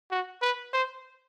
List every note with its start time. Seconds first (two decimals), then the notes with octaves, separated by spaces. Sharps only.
0.11 F#4
0.42 B4
0.73 C5